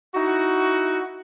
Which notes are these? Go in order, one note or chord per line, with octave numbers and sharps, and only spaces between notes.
D#4 E4 F#4